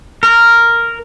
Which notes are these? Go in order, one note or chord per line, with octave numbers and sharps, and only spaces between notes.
A#4